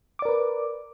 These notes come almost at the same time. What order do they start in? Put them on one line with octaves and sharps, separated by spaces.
D6 D5 A#4 B4